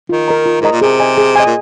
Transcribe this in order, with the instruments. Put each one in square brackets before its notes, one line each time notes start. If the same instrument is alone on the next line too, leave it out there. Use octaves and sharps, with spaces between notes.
[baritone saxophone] D#3 [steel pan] F4
[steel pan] A#4 D#5 A#5
F4
[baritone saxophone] G#2 [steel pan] A#4 D#5 A#5
[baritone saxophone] A#2
[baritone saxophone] C3 [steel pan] G#4
[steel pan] D#5 G#5
G#4
D#5 G#5
[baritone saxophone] A#2